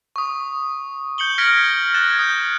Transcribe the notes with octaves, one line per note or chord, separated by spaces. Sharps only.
C#6 D#6
G6 C#7 F#7 G7
F6 G#6 A#6 B6 C#7 D7
F#6 G#6 A6 E7
D#6 G6